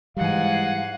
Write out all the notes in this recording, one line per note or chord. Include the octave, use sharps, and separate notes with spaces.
G#2 E3 G3 F5 F#5 G#5